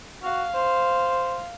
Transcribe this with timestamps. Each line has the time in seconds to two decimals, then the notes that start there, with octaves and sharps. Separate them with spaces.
0.23 F#4 F5
0.54 C5